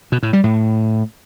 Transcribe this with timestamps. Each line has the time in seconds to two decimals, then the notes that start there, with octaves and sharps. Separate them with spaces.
0.12 B2
0.23 A2
0.33 G3
0.44 A2